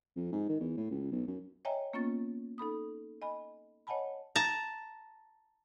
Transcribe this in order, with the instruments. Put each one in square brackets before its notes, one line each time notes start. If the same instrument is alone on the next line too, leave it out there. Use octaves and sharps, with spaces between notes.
[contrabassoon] F2
G#2
D#3
E2
A2
C#2
B1
F#2
[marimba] C#5 D#5 E5 G5 G#5 A#5
A#3 B3 C#4 F4 C#6 A6
D#4 A4 B5 D#6
D#5 G#5 B5
C#5 D#5 F#5 G#5 A5 B5
[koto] A5 A#5